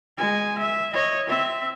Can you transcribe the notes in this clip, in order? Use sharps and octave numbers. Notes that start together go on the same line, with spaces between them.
G#3 G#5
E5
C#5 D#5
C4 E5